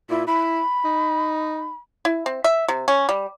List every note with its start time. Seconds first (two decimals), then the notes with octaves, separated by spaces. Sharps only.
0.10 A#2 E4
0.27 E4 B5
0.85 D#4
2.05 E4
2.26 C4
2.44 E5
2.68 C3
2.88 C#4
3.09 G3